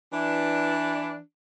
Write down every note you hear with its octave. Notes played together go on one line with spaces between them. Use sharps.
E3 D4